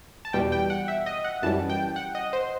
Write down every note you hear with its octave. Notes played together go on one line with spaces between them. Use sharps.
A5
E2 B2 G3 G5
G5
F#5
E5
D#5
F#5
F#2 E3 G3 A5
G5
F#5
D#5
C5